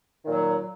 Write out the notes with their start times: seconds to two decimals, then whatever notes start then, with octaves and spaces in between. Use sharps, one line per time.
0.22 D#3
0.27 A#2
0.31 F#3